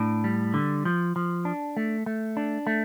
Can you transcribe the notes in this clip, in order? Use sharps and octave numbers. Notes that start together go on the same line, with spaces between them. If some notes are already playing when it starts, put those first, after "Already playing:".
Already playing: A2 D4
G3
D3
F3
F3
D4
A3
A3
D4
A3